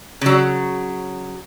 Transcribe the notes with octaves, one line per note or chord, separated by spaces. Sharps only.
C#3 F#3